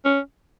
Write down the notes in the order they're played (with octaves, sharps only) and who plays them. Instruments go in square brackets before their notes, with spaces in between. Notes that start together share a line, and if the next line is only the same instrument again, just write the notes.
[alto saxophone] C#4